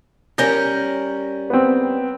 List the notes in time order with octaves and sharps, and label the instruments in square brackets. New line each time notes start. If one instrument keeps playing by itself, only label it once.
[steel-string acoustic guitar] G3 C#4 A#4 [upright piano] G6 A#6
[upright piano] B3 C4